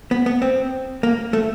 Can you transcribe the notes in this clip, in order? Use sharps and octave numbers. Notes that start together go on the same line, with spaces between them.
B3
B3
C4
A#3
A3